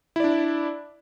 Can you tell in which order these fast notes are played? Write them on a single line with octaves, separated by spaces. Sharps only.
E4 D5 D4